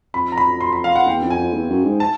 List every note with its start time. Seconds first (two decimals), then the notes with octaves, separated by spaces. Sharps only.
0.14 F2 B5
0.32 A#5
0.38 B5
0.61 C6
0.73 B5
0.84 F5
0.95 F#5
1.07 E2 G5
1.23 F2
1.30 G#5
1.39 F2
1.54 E2
1.70 F#2
1.84 G#2
2.00 A5